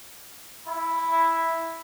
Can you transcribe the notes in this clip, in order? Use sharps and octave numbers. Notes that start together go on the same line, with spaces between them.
E4